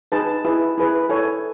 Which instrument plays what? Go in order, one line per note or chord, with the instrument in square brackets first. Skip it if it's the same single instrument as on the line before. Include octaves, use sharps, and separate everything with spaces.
[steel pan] D#4 G#4 B4 A5
E4 G#4 B4
E4 G#4 B4
E4 A4 C#5 G#5